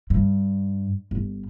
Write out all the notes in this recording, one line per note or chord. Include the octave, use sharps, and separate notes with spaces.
G2
G1